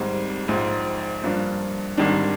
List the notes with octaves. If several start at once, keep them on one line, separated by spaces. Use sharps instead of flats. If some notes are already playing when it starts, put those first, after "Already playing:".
Already playing: G#1 G#2 G3 C4
A#1 G#2 F3
G2 F3 A#3 D4
G#1 G#2 D#3 G3 D4